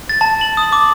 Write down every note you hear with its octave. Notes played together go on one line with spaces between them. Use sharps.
A6
A5
F#7
D#6
D6